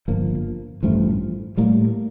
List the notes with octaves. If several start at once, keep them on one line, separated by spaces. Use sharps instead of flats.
G1 G2 F3 A#3
A1 G2 F3 A3
A2 G3 A#3